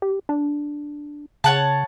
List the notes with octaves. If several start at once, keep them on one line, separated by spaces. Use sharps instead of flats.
G4
D4
C#3 C#5 F#5 A5